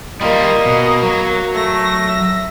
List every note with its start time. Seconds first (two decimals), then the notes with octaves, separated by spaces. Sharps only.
0.21 G3 A#3 F4 D#5
0.66 B2
1.03 F#3
1.55 A3 A#6
2.08 E5